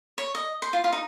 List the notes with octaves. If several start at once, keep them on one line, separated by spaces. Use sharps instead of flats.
C#5
D#5
C5
F4
F4
D#4